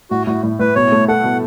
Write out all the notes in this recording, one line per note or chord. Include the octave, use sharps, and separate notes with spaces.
A2 F#4
A2 F#4
A2
A2 B4
B2 C#5
A3
A4 F#5
B2